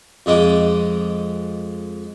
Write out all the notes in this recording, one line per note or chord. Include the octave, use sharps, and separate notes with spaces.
F2 G#3 D#5 B5 D6